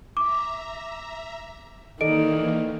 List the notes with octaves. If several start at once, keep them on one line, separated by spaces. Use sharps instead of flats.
E5 A#5 D6
D#3 E3 A#3 A4 D5 D#5 D7